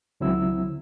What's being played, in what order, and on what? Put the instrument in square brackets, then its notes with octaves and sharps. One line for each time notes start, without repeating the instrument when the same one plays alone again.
[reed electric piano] C#2 D3 F#3 C4 E4 E6